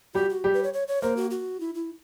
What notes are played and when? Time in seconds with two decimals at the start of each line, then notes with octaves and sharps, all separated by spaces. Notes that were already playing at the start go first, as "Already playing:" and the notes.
0.14 G3 F#4 G4
0.30 F#4
0.44 G3 G4
0.54 B4
0.63 C#5
0.74 C#5
0.88 C#5
1.02 A#3 A#4 C5
1.17 F#4
1.31 F#4
1.60 E4
1.75 E4